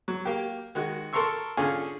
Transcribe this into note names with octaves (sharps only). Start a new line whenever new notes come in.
F#3
A#3 G4
D#3 G#3 F#4
A4 A#4 A#5 C6 C#6 E6
D3 C#4 F4 G#4